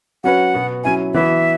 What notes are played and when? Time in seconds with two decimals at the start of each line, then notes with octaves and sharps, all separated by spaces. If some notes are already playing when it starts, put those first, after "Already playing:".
0.24 F#3 C#4 F#4 B4 F#5
0.54 B2 B3 F#4
0.84 F#3 C#4 E4 G#5
1.14 E3 B3 F#4 B4 E5